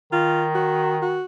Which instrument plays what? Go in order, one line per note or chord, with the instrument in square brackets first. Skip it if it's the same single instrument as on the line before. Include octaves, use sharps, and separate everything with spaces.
[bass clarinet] D#3 [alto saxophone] F4
[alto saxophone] F#4
F#4